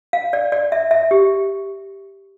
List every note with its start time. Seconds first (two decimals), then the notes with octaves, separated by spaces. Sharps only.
0.13 F5
0.33 D5
0.52 D5
0.72 E5
0.91 E5
1.11 G4